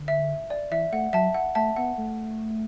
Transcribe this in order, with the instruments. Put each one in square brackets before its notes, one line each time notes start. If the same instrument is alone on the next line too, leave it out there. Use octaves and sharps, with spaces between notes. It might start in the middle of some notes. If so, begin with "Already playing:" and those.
Already playing: [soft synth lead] D3
[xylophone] E5
D5
[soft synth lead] E3 [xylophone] E5
[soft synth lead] A3 [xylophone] F#5
[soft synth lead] F#3 [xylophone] E5 A5
[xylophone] F#5
[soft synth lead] A3 [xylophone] E5 A5
[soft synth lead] B3 [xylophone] F#5
[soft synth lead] A3